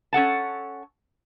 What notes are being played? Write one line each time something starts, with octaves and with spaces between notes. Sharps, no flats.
C#4 A4 F#5 A5